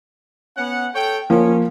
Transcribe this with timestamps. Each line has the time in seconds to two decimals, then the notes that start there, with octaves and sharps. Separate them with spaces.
0.57 B3 C#4 F#5
0.94 A4 C#5 G5
1.30 F3 A#3 C#4